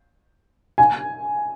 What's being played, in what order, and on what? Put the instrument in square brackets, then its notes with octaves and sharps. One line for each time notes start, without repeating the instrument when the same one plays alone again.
[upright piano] G#5